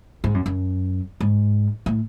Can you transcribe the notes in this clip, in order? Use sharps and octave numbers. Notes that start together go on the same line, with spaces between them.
G#2
F#2
F#2
G#2
A2